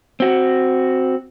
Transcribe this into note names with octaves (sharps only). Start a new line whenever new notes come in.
C4 F#4